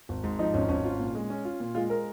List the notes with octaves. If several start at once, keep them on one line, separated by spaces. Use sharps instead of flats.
G#1
G#2
F3 D#4
G#1 C#4
G#1 C#4
F4
A#2
G#3
C#4
F4
A#2
G#3 F4
A#4